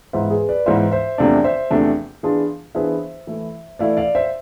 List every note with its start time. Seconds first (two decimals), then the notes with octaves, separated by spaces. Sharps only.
0.13 G#2 E3 B3 F4 C5 E5
0.31 G#4 B4
0.49 B4 D5
0.66 G#2 E3 B3 F4 C5 E5
0.92 C5 E5
1.18 E2 C3 F3 A3 D4 D5 F5
1.44 C5 E5
1.70 E2 C3 F3 A3 D4
2.23 E3 B3 D4 F4 G#4
2.75 E3 B3 D4 F4 G#4 C5 E5
3.27 E3 A3 E4
3.79 E3 A3 E4 D5 F5
3.97 D5 F5
4.15 C5 E5